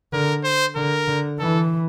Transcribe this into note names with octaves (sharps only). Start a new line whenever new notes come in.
D3 A#4
C5
D3 A#4
D3
E3 A4